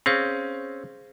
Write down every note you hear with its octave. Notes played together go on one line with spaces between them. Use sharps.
C4 C#4 G#4 C5 F5